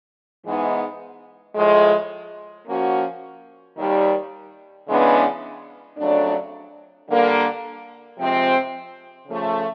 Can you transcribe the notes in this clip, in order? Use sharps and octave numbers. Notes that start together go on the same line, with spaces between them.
G#2 E3 G#3 B3 D#4
A2 F3 G#3
F3 A#3 C#4 F#4
D#2 D#3 G3
C#3 E3 G#3 B3 D4
F2 C#3 F#3 A3 D4
D3 G3 A#3
C3 F3 G#3 C4
C#3 F3 A3